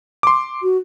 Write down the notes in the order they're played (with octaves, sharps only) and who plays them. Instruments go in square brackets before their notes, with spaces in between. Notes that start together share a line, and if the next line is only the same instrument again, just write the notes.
[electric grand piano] C6 D6
[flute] F#4